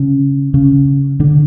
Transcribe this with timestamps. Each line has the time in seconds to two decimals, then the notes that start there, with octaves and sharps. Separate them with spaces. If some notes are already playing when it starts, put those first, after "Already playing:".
Already playing: C#3 C#4
0.54 C#3 C#4
1.20 D3 D4